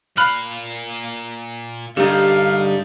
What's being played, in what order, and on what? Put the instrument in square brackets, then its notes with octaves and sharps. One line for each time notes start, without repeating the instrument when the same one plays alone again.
[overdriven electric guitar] A#2 F5 [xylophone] B5 F6 F#6
[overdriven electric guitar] G2 [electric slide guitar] D3 G3 D#4 [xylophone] G4 [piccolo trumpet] F5